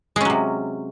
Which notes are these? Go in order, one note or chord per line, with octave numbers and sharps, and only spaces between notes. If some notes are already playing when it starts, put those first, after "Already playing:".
C3 F#3 G#3 C#4